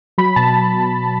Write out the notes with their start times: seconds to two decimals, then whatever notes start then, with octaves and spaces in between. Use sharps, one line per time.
0.18 F#3 B5
0.36 B2 A5